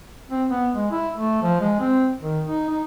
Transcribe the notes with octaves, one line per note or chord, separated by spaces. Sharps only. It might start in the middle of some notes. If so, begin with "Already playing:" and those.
C4
B3
G#3
E4
A3
F3
G#3
C4
D#3
D#4
D#4